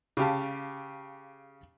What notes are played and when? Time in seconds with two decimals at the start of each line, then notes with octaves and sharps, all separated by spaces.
0.17 C#3 G4 F5 A5